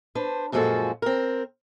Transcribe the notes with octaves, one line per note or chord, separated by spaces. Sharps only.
D4 B4 C5
F#2 A#2 F3 G#3 F#4 A4
C4 A#4